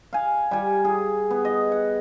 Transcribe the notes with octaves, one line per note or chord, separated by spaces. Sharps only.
F5 G#5
G3 G#5
G#4
B3
D#5
F#5